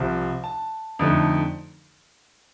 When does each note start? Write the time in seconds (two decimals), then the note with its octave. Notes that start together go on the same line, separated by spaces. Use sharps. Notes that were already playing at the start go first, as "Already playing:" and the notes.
Already playing: C2 C3 F3
0.44 A5
0.99 F2 D3 A3 D#4